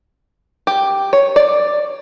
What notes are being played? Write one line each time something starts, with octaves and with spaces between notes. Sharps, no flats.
G4
C#5
D5